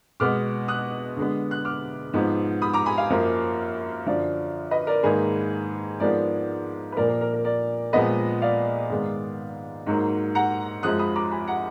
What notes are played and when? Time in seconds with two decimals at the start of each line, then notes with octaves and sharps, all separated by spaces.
0.20 B2 G#3 B3 D6 F6
0.68 D#6 F#6
1.17 D3 G#3 B3
1.51 F#6
1.65 D6 F6
2.13 G#2 F3 B3
2.62 B5 D#6
2.74 A#5 D6
2.86 G#5 B5
2.98 F5 G#5
3.10 F#2 F3 A#3
4.07 F#2 D3 F3 D5 F5
4.71 B4 D#5
4.87 A#4 D5
5.03 G#2 D#3 A#3 G#4 B4
6.00 G#2 F3 G#3 B3 A#4 D5
6.92 B4
6.96 A#2 F3 A#3 A#4 D5
7.09 A#4
7.21 A#4
7.33 A#4
7.45 A#4 D5
7.93 A#2 F3 G#3 B3 B4 D#5
8.42 D5 F5
8.90 G#2 D#3 G#3 B3
9.86 G#2 F#3 A#3
10.35 F#5 A#5
10.83 F#2 F3 G#3 D#6 F#6
10.99 B5 D#6
11.15 A#5 D6
11.31 G#5 B5
11.48 F#5 A#5